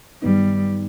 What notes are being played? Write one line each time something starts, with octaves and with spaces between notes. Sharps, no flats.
G2 D#3 F#3 G3 B3 D#4